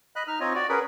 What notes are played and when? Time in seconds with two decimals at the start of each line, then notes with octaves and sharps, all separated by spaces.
0.16 D#5 B5 F#6
0.28 D#4 F6
0.40 C4 F4 C#5 D#5
0.55 F#4 D5
0.69 C#4 G#4 A#4 B4